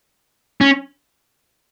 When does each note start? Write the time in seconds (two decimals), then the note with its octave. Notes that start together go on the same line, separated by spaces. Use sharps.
0.61 C#4